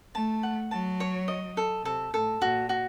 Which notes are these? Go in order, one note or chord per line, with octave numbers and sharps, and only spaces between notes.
A3 A5
F#5
F#3 A5
C#5
D#5
A4
C3 A4
A2 A4
A#2 F#4
F#4